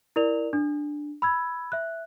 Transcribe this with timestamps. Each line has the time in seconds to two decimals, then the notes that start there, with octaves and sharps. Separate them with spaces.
0.16 E4 A#4 D5 F7
0.53 D4
1.22 B5 E6 G#6
1.72 E5 F#6